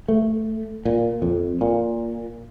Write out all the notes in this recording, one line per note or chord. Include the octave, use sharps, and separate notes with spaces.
A3
A#2
F2
A#2